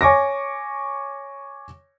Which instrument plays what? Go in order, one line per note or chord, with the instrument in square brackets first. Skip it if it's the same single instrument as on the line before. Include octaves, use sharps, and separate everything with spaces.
[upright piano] C#5 G#5 C#6 D6 A#6